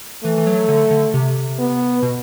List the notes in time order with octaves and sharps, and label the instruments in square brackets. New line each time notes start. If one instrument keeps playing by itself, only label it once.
[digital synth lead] E3 [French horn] A3
[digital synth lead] E3
F#3
D3
D3
C3
[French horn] B3
[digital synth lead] B2